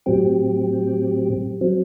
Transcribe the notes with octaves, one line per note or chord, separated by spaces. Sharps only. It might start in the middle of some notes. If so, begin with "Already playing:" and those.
A2 F#3 C4 G4
F#3 C4